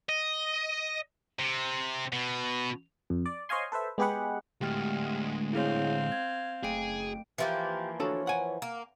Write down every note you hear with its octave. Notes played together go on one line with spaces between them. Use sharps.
D#5
C3
B2
F2
D5
C5 C#5 D#5 F5 G#5 C6
A4 B4 C5 E5
G#3 B3 G4 G#4 B4 F#5
D2 A2 G#3 G4 G5 F6
C4 E4 G#4 C#5 F5
G#6
F#1 A3 G#4 G5 D7
E3 F3 A#3 G4
D4 F#4 A4 C#5
F#5 G#5
A#3